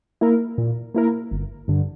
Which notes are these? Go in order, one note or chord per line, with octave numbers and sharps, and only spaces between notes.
A#3 E4 A#4
A#2
A#3 E4 A#4
G1
G2 D3